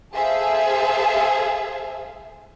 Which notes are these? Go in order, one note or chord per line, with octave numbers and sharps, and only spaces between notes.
G#4 A4 C5 E5 F5